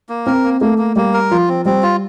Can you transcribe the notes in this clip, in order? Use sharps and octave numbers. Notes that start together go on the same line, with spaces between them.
A#3
C4 A#4
A#3
A3 A#3
A#3
G3 A#3
A#4
F3 F4
C4
G3 C4
F4